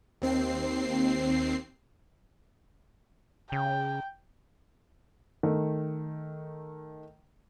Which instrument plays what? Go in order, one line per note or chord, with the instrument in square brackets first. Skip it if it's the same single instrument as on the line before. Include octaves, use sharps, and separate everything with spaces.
[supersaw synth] D#2 C4 C7
[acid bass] C#3 [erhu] G5
[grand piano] D#3 A3